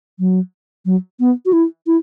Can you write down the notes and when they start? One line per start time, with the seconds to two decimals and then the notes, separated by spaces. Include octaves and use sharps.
0.19 F#3
0.86 F#3
1.20 B3
1.46 F#4
1.53 E4
1.87 E4